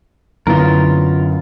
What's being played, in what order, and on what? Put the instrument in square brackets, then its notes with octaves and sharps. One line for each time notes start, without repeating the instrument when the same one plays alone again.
[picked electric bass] F#2 [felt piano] D3 B3 E4 [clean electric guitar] F4 A#4